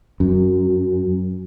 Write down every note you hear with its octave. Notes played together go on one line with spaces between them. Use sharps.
F#2